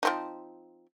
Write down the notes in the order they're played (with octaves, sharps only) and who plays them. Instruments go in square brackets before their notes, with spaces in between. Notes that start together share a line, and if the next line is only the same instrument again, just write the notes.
[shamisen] F3 C4 D#4